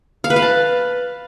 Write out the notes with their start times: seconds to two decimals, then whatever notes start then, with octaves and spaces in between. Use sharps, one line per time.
0.24 F5
0.30 B4
0.36 F5
0.42 A5